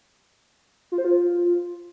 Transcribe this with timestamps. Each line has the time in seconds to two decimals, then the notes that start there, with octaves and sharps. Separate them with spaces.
0.92 F4
0.98 C5
1.05 F4